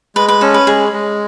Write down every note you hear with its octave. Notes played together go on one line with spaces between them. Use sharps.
G#3 B4
B4
C#4 A4
B4
G#3 G#4
G#3